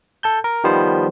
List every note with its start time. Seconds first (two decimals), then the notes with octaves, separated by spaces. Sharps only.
0.23 A4 A5 G6
0.44 A#4
0.64 D#3 F3 G3 B3 C5